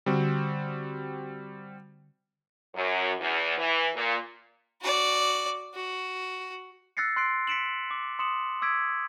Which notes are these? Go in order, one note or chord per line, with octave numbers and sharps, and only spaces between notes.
D3 G3 C4 F#4
F#2
E2
E3
A#2
F#4 D5
F#4
E6 F#6 A6 A#6 C7 C#7
C6 F#6 C7 D7
B6 C#7 D7 E7 F#7
D6
C6 D#6 C#7 E7 F#7
D6 E6 G#6 B6 D7